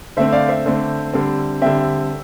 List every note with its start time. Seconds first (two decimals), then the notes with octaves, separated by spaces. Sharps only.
0.17 D3 A3 C4 C5 E5
0.32 D5 F5
0.49 C5 E5
0.66 D3 A3 C4
1.13 D3 G3 C4
1.62 D3 G3 C4 E5 G5